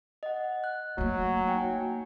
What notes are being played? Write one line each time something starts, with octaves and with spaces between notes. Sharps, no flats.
D#5 F#5
F#6
F#3 A3 A#3
D#4 G5 G#5